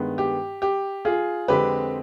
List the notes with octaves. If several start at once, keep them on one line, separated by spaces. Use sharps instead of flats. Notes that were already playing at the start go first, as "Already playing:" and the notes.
Already playing: G2 D#3 G#3 B3
G4
G4
F4 G#4
F2 D3 G#3 C4 G4 B4